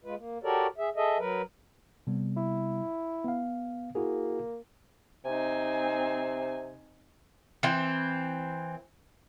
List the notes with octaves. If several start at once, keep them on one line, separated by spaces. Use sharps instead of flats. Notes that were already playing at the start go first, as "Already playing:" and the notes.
G#3 F4 B4
A#3
F#4 G4 A4 A#4 C#5 D5
G#4 E5
G#4 A4 D#5 E5
F#3 A#4 B4
C3 G3 B3
E4
B3 F5
A#3 E4 F#4 G#4
C3 C4 D#4 G#5
E3 C4